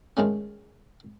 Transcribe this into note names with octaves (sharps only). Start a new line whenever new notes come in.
D#3 G#3 A3 C#4